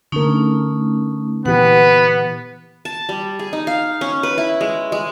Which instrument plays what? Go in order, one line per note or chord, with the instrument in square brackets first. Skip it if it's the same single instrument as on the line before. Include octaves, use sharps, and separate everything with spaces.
[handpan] D3 A#3 A#4 [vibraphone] A3 C#4 D#4
[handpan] A#2 E3 G4 [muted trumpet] B3 [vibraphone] B4 F#5
[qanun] A5
G3
G#4
D#4
F5
C#4
B4
E4
G#3
G#3